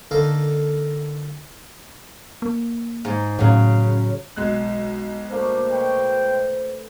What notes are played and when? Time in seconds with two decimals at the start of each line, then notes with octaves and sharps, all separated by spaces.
0.11 D3 A#3 D#4 A4 F5 A#5
2.42 A#3
3.05 G#2
3.39 A2 C#3 F#3
4.36 B1 G#3 F#6
5.31 A3 A#3 D4 C5
5.71 B4 C#5 G5